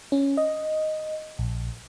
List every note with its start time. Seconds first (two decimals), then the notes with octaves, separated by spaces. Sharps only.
0.12 C#4
0.37 D#5
1.39 A#1